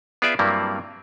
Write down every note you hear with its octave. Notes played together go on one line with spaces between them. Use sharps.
B3 F4 G#4 D5 E5
G2 F#3 G3 A#3 C4 E4